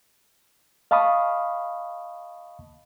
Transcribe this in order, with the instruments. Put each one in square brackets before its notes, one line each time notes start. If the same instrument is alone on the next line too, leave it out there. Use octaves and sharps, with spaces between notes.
[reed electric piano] D#5 F5 A5 B5 C#6 D#6